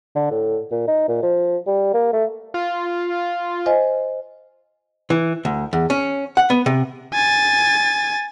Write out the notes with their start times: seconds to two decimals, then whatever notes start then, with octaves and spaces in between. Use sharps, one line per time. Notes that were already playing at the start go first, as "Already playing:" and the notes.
0.15 D3
0.31 A2
0.71 A#2
0.88 D#4
1.09 A#2
1.23 F3
1.67 G3
1.94 A#3
2.13 A3
2.54 F4
3.66 C5 D#5 G#5
5.10 E3
5.45 D2
5.73 E2
5.90 C#4
6.37 F#5
6.50 B3
6.66 C3
7.14 G#5 A6